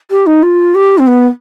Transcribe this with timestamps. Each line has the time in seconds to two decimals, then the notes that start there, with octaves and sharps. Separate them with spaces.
0.10 G4
0.26 D#4
0.42 F4
0.74 G4
0.98 C4
1.07 B3